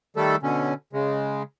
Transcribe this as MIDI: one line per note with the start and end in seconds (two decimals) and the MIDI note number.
0.16 0.36 51
0.16 0.36 55
0.16 0.36 57
0.16 0.36 69
0.42 0.74 47
0.42 0.74 50
0.42 0.74 61
0.93 1.43 49
0.93 1.43 56